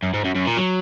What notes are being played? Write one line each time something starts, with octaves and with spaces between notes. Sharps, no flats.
F#2
G#2
F#2
F#2
A#2
F#3